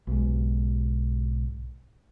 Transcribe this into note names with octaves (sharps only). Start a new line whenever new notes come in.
B1 G#2